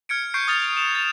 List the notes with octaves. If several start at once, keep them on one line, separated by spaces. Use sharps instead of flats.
F6 G#6 C#7 D7
C#6 G6 C7 D7
D#6 F6 A6 F7
E7 F7
A6 F7